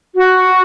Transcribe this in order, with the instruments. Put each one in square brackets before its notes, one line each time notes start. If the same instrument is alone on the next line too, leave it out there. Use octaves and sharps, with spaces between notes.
[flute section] F#4